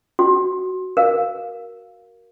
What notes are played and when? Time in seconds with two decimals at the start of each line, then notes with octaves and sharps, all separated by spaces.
0.19 F#4
0.97 A#4 F5